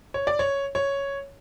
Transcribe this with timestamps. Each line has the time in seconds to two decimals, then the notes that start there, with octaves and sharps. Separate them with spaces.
0.14 C#5
0.27 D5
0.39 C#5
0.75 C#5